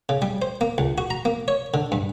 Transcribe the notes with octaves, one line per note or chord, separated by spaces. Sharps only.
C#3
G3
C5
A#3
C#2
F#4
A#5
A#3
C#5
D3
G2